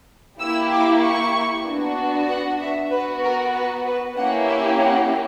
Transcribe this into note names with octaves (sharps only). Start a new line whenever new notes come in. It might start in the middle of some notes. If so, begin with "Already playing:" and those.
A#3 E4 G4 E6
D6
C#6
B3 D4 F#4
F#5
E5
B3 F#4 B4
A#4
B4
B4
A#3 C#4 E4 G4 F#5
E5
F#5